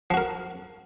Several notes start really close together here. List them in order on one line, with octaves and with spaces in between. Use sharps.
F3 F#4 A#4